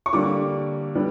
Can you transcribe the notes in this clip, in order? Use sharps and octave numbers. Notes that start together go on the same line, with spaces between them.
C#6
D3 G3 A#3 D6
D3 G3 B3